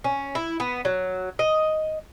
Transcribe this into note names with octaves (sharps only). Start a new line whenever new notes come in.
C#4
E4
B3
F#3
D#5